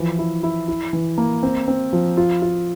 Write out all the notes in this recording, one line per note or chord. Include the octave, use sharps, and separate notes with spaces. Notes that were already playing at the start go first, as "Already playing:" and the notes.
Already playing: E3 F3
E4
E4
E4
E3
A#3
C4
C4
F3
F4
F4